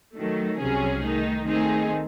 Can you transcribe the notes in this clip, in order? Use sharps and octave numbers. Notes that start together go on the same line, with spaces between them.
D#3 F#3 A3
C2 C3 F#3 C#4 G#4
D#3 A3 D#4
D#3 A3 C4 D#4 G#4